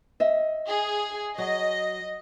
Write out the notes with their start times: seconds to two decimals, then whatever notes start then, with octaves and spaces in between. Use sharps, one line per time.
0.20 D#5 E5
0.68 G#4
1.38 F#3 D#5